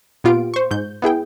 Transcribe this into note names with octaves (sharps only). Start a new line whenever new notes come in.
A#2 B3 F4 G4 D7
C5 C#6
G#2 G6
B3 E4 G#4 G5